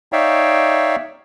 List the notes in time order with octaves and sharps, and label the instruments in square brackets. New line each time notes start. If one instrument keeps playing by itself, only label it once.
[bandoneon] D#4 C#5 D5 E5 F5 G5